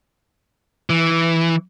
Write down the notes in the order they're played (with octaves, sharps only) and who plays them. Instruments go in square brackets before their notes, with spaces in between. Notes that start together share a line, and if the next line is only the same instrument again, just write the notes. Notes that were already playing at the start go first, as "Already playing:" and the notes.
[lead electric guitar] E3